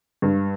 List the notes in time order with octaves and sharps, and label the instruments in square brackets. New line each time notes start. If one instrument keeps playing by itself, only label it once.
[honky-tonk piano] G2